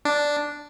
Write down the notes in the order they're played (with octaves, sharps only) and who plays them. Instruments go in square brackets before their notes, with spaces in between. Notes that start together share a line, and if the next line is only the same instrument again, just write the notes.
[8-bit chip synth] D4